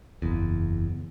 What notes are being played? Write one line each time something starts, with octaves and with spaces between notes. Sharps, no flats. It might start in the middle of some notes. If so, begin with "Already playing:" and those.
F#1 E2